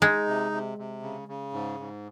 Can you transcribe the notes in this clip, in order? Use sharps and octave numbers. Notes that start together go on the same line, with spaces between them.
G#3 D#4
C3
C3
C3
C#3
C#3
G#2
G#2